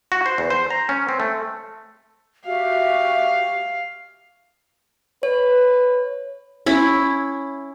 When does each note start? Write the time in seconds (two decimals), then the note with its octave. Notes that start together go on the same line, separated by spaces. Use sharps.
0.12 F#4
0.26 C5
0.38 E2
0.50 C5
0.70 A#5
0.89 C#4
1.09 C4
1.20 A3
2.46 F#4 G4 E5 F5
5.23 B4 C#5
6.66 C#4 E4